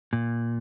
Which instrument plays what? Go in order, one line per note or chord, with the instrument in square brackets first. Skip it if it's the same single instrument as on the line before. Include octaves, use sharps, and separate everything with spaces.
[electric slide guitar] A#2